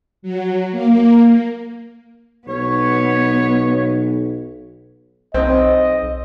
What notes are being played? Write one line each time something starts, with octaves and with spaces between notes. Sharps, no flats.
F#3
A#3
B1 B3 C#5
B1 C4 D#5